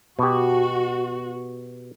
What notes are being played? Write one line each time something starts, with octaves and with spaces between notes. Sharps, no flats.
B2 F#4 G4